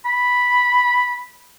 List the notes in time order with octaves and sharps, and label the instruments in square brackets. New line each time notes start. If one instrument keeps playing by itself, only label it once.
[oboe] B5